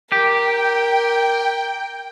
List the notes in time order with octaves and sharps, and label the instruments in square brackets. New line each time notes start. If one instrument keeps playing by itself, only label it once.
[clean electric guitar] G4 [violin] A#4 [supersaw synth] G5